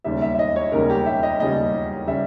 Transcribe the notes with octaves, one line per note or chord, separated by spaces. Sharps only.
E1 D#2 C#3 G3 E5
E5
E5
D#5
C#5
E1 D#2 C#3 G3 A#4
G4
E5
D#5
E1 D#2 C#3 G3 D#5
C#3 G3 E5